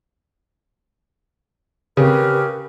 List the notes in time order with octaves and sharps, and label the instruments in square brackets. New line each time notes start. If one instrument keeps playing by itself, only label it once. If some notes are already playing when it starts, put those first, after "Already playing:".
[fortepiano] C#3 [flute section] G4 A#4 B4